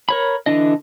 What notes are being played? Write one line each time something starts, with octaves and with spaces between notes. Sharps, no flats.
A#4 C#5 B5
D3 E3 D4 D#5